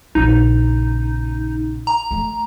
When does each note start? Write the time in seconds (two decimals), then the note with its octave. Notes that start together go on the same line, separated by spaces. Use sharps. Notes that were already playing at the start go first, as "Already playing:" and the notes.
0.15 A#1 C#3 D#4
1.87 A#5
2.11 A3